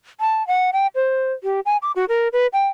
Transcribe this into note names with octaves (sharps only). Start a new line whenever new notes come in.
A5
F#5
G5
C5
G4
G#5
D6
F#4
A#4
B4
G5